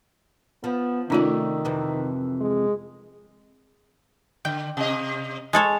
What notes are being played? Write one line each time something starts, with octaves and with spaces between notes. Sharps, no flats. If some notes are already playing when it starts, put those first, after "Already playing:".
F3 B3
C3 D#3 A3 C#4 D#4 F4 D5
F2 C3 E3
G#3
D3 G5
C3 D#5
G#3 A4 C#5